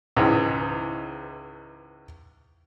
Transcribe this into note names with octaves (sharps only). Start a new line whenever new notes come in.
C#2 G#2 E3